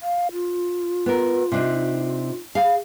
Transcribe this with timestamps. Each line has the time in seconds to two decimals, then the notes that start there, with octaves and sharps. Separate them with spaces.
0.01 F5
0.33 F4
1.06 B3 A#4
1.52 C3 D4 D#4
2.55 G#4 F5